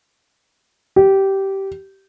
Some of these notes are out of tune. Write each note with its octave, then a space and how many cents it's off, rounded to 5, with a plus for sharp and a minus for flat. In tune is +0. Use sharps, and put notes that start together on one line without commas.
G4 -15